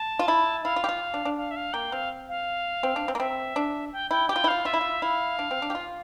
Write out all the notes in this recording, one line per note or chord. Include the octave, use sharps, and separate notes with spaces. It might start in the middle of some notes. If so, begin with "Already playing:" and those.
Already playing: A5
F4
E4
E4 F5
F4
G4
F4
D4
D4
F5
E5
F5
A#3 G5
C4 F5
F5
C4
D4
C4
A#3
C4 E5
D4
G5
E4 G5
G4 G5
F4
E4
F4 F5
F4 E5
E4
F4
E4 F5
D4
C4
D4
G4
F4